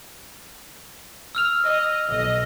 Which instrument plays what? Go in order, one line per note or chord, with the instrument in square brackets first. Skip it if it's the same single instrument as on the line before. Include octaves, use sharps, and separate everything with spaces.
[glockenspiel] E6 F6 F7
[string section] D#5
B1 D#5